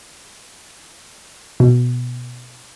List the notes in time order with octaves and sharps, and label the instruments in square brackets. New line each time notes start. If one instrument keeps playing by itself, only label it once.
[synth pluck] B2